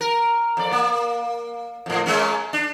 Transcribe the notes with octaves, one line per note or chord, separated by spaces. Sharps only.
A#4
F2 D5
A#3
F2 A2
G#3 A#3 C#4
D4